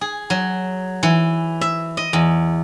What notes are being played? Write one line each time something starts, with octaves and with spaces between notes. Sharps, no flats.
G#4
F#3
E3
E5
D#5
E2